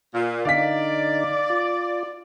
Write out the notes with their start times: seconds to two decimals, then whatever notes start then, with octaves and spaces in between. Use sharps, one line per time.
0.14 A#2
0.45 D3 D#4 D5 F5 B6
1.50 F4